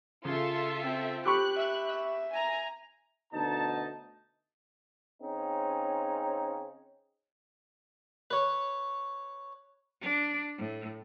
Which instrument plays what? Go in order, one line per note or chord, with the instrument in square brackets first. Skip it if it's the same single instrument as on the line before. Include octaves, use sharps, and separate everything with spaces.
[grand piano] C#3 [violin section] F4 A4 E5 [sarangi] C6
[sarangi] C4
[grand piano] G4 B5 C#6 [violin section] F#6
[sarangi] E5
E5
[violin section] G#5 A#5
[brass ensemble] D2 B2 D#4 A5
[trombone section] C#3 C4 C#4 D#4
[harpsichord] B4 C#5
[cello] D4
A2